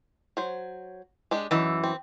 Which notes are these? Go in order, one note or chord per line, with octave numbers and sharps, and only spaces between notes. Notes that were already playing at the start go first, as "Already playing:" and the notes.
F#3 C5
G#3 D4 G4
F#2 E3 D#4
C4